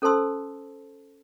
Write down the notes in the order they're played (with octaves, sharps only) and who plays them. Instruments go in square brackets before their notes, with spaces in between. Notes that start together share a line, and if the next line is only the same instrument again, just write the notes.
[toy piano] C#4 A4 C5 A5 C6 E6